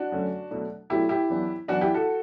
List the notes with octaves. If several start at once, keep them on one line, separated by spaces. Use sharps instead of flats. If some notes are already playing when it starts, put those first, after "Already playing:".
Already playing: D4 F#4
F#2 D3 A3 C#4
B2 F#3 A3 D4
B2 F#3 A3 D4 E4 G4
E4 G4
F#2 E3 B3 D4
F#2 E3 B3 D4 F#4
E4 G4
F#4 A4